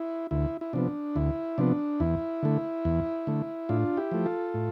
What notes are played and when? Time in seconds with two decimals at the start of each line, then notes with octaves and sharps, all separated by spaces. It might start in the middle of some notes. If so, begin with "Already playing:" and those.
Already playing: E4
0.31 D2 E4
0.61 E4
0.73 C3 F3 B3 D4
1.16 D2 E4
1.58 C3 F3 B3 D4
2.00 E2 E4
2.43 D3 A3
2.85 E2
3.27 D3 A3
3.69 A2 D4 F4
3.97 E4 G4
4.11 F3 A3
4.26 F4 A4
4.54 A2